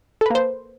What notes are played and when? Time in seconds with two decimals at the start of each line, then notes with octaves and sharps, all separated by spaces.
0.21 A4
0.26 B4
0.30 A#3
0.35 C5